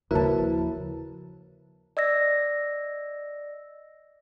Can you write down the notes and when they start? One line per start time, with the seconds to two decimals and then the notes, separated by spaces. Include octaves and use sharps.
0.11 D#2 C#3 F3 E4 F#4 A#4 B4 A5
1.97 D5 D#5 E6 A#6